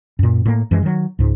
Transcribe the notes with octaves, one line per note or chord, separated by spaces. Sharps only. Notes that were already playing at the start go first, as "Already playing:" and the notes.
F#2 A#2
A2 A#3
F#2 E3 G#3
D#3 F#3
C#2 G#2